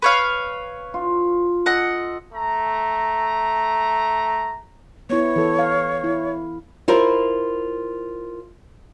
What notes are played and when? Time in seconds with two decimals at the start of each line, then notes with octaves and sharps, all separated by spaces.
0.02 B4 C#5 F5
0.94 F4
1.66 A4 D#5 F#5
2.32 A3 A#5
5.10 B3 E4 C#5
5.36 E3 A4
5.59 F5
6.04 E4
6.88 E4 F4 A#4 C5